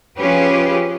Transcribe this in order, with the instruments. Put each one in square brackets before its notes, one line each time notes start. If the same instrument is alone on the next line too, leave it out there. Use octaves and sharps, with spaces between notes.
[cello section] F3 C#4 F4 G4 G#4 B4